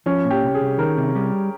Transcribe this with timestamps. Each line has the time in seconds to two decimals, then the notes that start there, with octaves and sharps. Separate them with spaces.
0.06 F3 C#4
0.25 A#2
0.31 G4
0.43 C2
0.55 G#4
0.61 C2
0.78 D#3 A#4
0.97 C3
1.15 G3